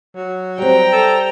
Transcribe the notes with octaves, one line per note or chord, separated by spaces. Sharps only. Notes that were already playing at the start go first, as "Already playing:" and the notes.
F#3
G3 C4 G5 A#5
A4